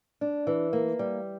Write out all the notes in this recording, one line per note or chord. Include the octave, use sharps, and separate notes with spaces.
D4
E3
A#3
G3